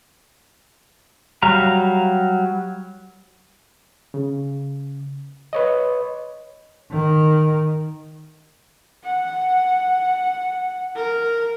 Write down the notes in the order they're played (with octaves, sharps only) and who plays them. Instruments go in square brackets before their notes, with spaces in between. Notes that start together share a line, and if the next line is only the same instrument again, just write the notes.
[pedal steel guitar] F#3 G3 F5 A#5
[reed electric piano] C#3
B4 C#5 D#5
[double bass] D#3
[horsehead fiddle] F#5
A#4